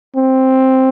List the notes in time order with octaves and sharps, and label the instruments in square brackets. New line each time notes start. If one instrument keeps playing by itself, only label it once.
[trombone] C4